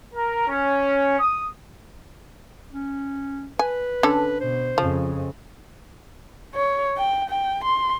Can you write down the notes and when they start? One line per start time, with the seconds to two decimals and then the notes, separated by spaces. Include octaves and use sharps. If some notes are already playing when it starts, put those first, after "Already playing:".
0.14 A#4
0.47 C#4
1.18 D#6
2.73 C#4
3.59 B4 G#5
4.03 D3 C#4 A4
4.41 B2 C5
4.78 F2 C#3 F3
6.55 C#5
6.97 G5
7.29 G5
7.64 C6